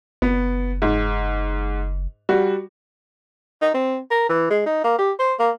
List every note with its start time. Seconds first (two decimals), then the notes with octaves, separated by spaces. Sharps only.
0.22 F#1 B3
0.82 G#2
2.29 G3 F#4
3.61 D#4
3.74 C4
4.11 A#4
4.29 E3
4.50 G#3
4.66 D#4
4.84 A#3
4.98 G4
5.19 C5
5.39 A#3